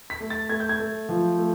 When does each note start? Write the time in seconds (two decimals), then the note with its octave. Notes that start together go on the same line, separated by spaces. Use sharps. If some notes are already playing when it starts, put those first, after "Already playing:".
0.10 B6
0.20 A3
0.30 A6
0.49 A3 G#6
0.60 G6
0.69 G#6
0.79 A3
1.09 F3
1.38 A3